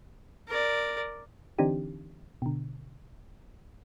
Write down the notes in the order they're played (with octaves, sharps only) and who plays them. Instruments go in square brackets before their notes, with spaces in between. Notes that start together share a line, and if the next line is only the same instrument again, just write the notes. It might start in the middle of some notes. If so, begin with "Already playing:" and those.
[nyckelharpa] A#4 D5
[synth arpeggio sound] D3 E3 C4 D4 D#4 G4
B2 D3